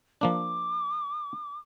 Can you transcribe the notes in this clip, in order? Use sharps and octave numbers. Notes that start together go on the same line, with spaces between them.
F3 A#3 D4 D6